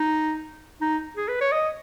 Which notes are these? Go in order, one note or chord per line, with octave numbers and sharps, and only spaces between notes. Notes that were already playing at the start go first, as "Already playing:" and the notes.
Already playing: D#4
D#4
G#4
B4
C#5
D#5